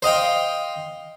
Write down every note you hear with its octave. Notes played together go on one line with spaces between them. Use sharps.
C5 D#5 F5 G5